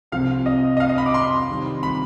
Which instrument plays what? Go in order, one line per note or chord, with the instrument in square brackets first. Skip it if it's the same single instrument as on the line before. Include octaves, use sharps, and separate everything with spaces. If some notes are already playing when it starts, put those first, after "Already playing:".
[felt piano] C2 C3 F3 C4 [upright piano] F5
[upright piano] D#5
D#5
F5
D#5
B5
D6
C6
[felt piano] C3 D#3 G3 C4 F4
[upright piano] B5